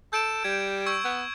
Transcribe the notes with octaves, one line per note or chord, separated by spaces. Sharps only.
A4 G6 D7 E7
G3 G#6
C#6 E6 G#6
B3